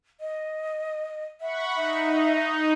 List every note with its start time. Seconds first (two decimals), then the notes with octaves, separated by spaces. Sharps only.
0.20 D#5
1.41 E5 F#5 B5 C#6
1.75 D#4 E5